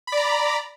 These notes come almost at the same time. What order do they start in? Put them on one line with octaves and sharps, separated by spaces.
B5 D5 A#5